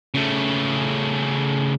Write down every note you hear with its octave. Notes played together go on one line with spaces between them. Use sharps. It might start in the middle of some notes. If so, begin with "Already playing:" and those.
C#3 A3